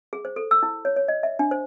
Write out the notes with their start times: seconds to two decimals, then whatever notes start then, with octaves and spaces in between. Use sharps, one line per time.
0.13 G#4
0.25 C5
0.36 A4
0.51 E6
0.63 E4
0.85 C#5
0.96 C#5
1.08 D#5
1.23 E5
1.39 D4
1.51 C5